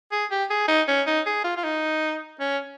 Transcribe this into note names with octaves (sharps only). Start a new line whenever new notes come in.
G#4
G4
G#4
D#4
C#4
D#4
G#4
F4
F4
D#4
C#4